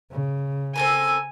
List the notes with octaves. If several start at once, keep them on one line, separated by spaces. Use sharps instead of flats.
C#3
C4 A4 A#4 G#5